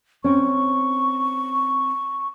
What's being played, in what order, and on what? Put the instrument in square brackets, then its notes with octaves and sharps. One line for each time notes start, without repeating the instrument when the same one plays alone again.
[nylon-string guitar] C4 C#4 [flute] C#6